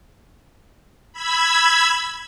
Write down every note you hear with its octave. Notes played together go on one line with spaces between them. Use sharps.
B5 E6 G#6